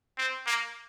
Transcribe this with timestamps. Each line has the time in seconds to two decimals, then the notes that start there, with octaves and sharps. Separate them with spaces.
0.18 C4
0.46 A#3